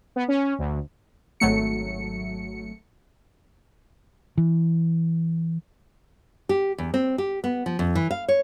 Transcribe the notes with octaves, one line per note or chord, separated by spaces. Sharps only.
B3
C#4
D2
G#1 F#3 A3 C#7
E3
G4
E2
C4
G4
B3
F3
F2
E3
F5
C#5